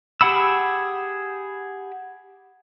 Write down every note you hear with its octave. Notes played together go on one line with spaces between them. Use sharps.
G4 G#4 F#5 B5 E6